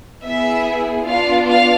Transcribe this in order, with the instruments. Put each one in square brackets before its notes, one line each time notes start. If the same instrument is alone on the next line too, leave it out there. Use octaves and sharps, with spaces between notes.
[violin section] B3 E4 G#4 E5
B3 D4 F4 F5
F5